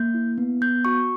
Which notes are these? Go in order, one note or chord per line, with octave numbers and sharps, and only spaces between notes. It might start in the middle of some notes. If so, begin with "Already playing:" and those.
Already playing: A#3 G6
E4
B3
B3 G6
F#4 C#6